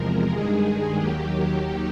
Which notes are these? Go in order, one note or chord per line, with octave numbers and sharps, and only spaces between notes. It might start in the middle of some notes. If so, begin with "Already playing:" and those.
Already playing: E2 C3 F3 G#3 A#4
G2 D#3 G#3 G#4
D#2 D#3 F#3 G4